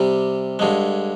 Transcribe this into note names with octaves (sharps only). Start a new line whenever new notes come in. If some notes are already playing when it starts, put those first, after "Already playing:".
Already playing: C3 G3
G2 D3 G#3